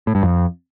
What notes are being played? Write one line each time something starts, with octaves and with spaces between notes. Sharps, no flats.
A2
G2
F2